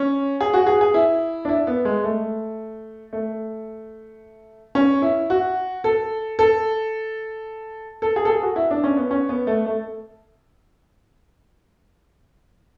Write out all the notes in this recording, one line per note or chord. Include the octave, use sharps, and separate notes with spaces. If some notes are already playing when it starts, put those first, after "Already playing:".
Already playing: C#4
G#4
F#4
G#4
G#4
E4
D4
E4
B3
G#3
A3
A3
C#4
E4
F#4
A4
A4
A4
G#4
A4
G#4
F#4
E4
D4
C#4
B3
C#4
B3
A3
A3